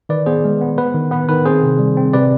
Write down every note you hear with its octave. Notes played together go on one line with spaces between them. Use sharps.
D#3 B4 D5
B3 G#4 C5
G#3
B3
B3 B4
D#3
B3 B4
D#3 B4
C4 G#4 C5
C3
G3
C4
C3 B4 D5